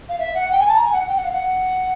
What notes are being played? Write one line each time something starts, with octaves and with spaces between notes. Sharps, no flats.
F5
E5
F#5
G5
G#5
A5
A#5
G#5
F#5
G5
F#5
F5
F#5